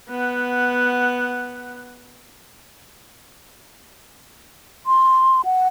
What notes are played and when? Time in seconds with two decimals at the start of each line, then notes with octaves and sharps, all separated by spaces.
0.10 B3 F#5
4.86 C6
5.45 F#5